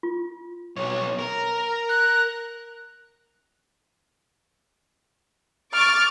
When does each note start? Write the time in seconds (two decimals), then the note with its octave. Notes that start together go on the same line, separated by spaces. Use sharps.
0.03 F4
0.76 B1 C#5
1.19 A#4
1.89 F#6
5.74 C#6 D6 F6 A6